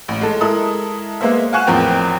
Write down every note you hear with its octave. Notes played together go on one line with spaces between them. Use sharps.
A1
G#3 A4
G#3 E4 A4 A#4 D#6
G#3 A#3 B3 C5 E5
F5 F#5 G#5 C#6 F#6 E7
A1 E2 F3 C4 A#4 G5